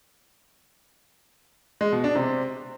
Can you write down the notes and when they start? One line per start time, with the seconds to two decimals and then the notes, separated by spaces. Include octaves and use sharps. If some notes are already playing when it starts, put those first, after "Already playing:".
1.81 G#3
1.92 B2
2.04 D4
2.15 C3